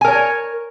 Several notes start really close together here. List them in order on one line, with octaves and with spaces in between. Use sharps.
G#5 A#4 C#5